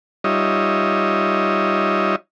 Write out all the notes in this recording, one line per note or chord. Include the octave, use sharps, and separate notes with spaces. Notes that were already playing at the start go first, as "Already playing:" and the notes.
G3 D#4 F4 C#5 D#5 E5